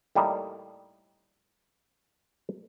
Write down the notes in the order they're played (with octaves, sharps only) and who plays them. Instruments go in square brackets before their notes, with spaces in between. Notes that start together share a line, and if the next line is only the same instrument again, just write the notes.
[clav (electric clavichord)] A2 G3 A#3 D#4